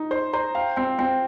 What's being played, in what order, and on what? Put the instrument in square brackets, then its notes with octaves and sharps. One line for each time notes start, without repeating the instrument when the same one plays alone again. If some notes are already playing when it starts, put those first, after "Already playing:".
Already playing: [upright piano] D#4
[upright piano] C5 [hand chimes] C6
[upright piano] C5 [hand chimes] A#5
[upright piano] F5 [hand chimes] G5
[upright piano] C4 [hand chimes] G5
[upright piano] C4 [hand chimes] G5